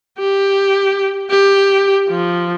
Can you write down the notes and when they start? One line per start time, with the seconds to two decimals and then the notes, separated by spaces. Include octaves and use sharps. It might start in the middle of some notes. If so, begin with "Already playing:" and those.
0.19 G4
1.31 G4
2.09 F3